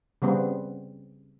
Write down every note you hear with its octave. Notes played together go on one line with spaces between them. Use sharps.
C#3 G3 B3 C4